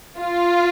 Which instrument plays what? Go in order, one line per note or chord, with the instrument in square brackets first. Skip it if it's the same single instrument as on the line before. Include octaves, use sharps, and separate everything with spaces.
[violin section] F4